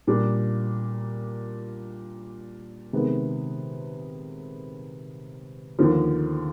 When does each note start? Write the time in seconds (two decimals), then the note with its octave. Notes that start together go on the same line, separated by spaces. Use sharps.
0.07 A#2 G3 A#3 D4
2.93 C3 D#3 G#3 B3
5.79 D#2 D3 F3